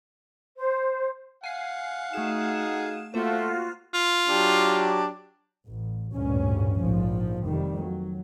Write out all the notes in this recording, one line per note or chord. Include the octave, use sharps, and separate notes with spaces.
C5
F5 F#5 G#5 C7
A3 D#4 F#4 G#4 E7
A3 A#3 F4 F#4 C5
F4
F#3 D4 G4
A1
A1 D2 G2 A#2 C#4
A#1 G#2 F3
F1 F2 D#3 G3
F#3